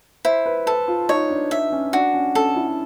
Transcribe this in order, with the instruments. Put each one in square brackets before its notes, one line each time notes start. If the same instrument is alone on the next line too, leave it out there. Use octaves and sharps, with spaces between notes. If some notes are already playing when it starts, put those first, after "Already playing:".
[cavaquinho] E4 [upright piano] C5
[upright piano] B4
[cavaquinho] A4 [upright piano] B4
[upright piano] F4
[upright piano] D#4 [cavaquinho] C#5
[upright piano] D4
[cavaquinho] E5
[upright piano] C#4
[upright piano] D4 [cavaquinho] F#4
[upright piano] C#4
[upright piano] C#4 [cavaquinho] A4
[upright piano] E4